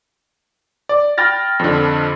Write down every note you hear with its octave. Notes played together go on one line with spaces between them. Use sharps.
D5
G5 B5 F6 A6 A#6
F2 D3